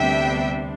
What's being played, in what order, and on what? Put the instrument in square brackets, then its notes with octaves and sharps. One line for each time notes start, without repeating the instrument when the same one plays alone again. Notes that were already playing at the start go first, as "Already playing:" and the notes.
Already playing: [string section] D2 C3 G3 B3 D4 E5 G5